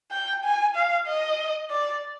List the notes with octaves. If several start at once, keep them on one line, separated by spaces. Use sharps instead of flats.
G5
G#5
F5
D#5
D5